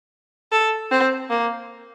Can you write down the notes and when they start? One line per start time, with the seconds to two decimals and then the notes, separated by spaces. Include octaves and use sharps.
0.52 A4
0.91 C4
1.30 A#3